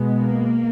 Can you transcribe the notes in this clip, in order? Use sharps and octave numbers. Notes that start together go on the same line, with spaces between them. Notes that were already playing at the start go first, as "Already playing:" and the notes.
Already playing: B2 G#3 B3
A#3